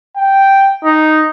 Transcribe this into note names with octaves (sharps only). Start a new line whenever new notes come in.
G5
D#4